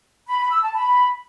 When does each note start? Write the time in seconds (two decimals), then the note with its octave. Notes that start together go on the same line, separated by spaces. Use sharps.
0.27 B5
0.39 B5
0.51 E6
0.62 A5
0.74 B5